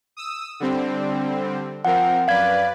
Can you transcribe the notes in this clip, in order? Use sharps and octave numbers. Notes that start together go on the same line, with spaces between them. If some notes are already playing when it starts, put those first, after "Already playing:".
D#6 E6
D3 G3 C4
F3 C4 A#4 F#5
F#2 B4 D5 F5 G#6